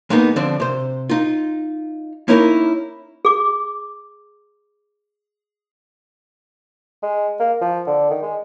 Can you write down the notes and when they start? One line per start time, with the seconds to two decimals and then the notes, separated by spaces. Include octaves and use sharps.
0.10 G#3 A#3 B3 D#4
0.36 D3 F3 C4 D4
0.60 C3 C5
1.09 D#4 F4
2.28 A#3 C#4 D#4 E4 A4 A#4
3.25 G#4 D6
7.03 G#3
7.40 A#3
7.61 F3
7.87 D3
8.11 D#3
8.22 G#3